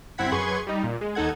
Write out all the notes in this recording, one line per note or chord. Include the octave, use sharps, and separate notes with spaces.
G1 C4 E4 F#5 G#6 B6
F#2 G#4 B4 C6 C#6 G#6
G3 D#4
A#2
G#3
D#2 D#4 A4 F#5 G#6